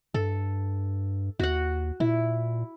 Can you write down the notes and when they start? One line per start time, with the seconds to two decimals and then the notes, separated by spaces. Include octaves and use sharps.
0.14 G2 A4
1.39 D#2 F#4 F#5
2.00 A#2 E4